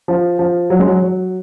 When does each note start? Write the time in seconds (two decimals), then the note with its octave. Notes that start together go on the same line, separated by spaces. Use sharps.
0.08 F3
0.39 F3
0.70 F#3
0.79 G#3
0.87 F#3
1.02 F#3